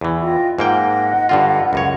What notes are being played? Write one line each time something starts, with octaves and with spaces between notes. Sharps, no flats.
E2 E3
F4 D#5 G5
G#2 A#3 D#5 F#5 G5
G2 D3 F4
C#2 F#2 C#5